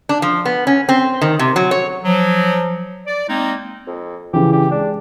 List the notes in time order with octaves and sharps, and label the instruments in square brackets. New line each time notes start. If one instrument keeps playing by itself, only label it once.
[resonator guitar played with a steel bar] D4
F3
B3
C#4
C4
D#3
C3
F#3
C#5
[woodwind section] F3 F#3
D5
G#3 A#3 C4 D#4
[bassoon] F2
[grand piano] C#3 E3 [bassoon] G4
[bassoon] G4
[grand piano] G#3 [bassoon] D4